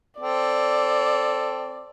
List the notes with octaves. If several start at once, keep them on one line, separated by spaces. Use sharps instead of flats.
C4 A4 D5